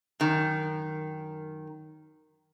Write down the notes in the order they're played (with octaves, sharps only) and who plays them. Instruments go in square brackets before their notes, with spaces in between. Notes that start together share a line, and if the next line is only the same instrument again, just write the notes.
[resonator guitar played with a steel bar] F#2 D#3